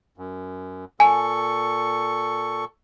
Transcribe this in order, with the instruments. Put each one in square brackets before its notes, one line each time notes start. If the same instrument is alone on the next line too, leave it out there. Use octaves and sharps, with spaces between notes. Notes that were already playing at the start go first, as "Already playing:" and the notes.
[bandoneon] F#2
[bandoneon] A#2 A4 C#6 [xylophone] G#5